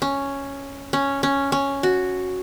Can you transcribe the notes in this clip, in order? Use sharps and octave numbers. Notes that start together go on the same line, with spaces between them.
C#4
C#4
C#4
C#4
F#4